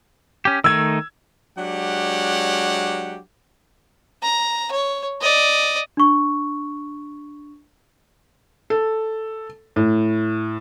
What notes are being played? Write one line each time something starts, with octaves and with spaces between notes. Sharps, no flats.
C#4 G4
D#3 A3 D#4 E6 G#6
F#3 G#3 D4 G4 F#5
A#5
C#5
D5 D#5
D4 C#6
A4
A2